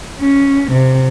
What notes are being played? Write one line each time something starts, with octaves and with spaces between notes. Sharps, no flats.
C#4
C3